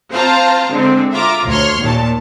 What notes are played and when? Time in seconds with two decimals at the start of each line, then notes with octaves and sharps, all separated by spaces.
0.13 C4 F4 C5 F5 A5 A#5
0.71 D3 G#3 C4
1.13 F4 E5 A#5 D6
1.48 D2 C#5 C6 F6
1.80 D#2 A#2 A5